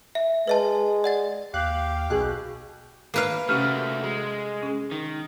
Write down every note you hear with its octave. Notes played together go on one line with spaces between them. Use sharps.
E5
G#3 B4 D#5 A5
D5 F#5 A6
D#2 G4 F5 F#6
B1 B2 G#4 F#6
A#3 B4 F5
C3 A3 C#4 F#4 G4 F6
G#3
C#4 G#4
D#3